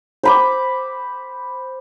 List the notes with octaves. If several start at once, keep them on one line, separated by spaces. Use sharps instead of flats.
C5 B5 D6